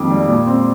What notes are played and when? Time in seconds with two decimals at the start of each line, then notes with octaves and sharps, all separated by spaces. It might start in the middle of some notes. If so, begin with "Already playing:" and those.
Already playing: F2 D#3 A#3 D6
0.10 G3
0.28 A#2
0.47 C4